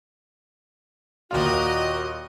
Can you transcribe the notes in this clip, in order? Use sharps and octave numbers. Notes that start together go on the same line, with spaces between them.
D#2 A#2 F4 F#4 A#4 D#5